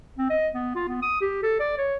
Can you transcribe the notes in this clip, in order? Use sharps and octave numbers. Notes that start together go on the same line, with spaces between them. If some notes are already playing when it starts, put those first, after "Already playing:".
C4
D#5
B3
F4
B3
D#6
G4
A4
D5
C#5